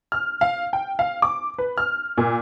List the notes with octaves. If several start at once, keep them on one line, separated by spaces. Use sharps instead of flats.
F6
F5
G5
F5
D6
B4
F6
A#2